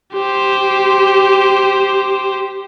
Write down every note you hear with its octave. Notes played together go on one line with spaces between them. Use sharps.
G4 C5